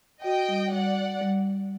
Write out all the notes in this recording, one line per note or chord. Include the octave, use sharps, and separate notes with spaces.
F#4 D#5 G5
G3
G3 D5 F#5
G3
G3